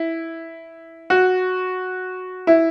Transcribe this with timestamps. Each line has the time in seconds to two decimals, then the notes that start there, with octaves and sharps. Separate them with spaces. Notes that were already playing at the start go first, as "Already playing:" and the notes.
Already playing: E4
1.10 F#4
2.47 E4